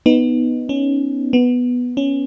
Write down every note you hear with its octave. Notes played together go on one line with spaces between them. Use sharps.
B3 D#4
C#4
B3
C#4